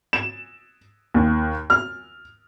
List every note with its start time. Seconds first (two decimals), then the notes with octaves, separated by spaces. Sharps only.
0.13 E7
1.14 D#2
1.70 F6